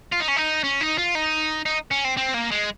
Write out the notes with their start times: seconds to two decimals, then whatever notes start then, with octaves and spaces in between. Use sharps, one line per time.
0.13 F4
0.20 D#4
0.28 C#4
0.37 D#4
0.64 C#4
0.81 D#4
0.98 F4
1.15 D#4
1.66 D#4
1.91 C#4
2.05 C4
2.17 C4
2.34 A#3
2.51 G#3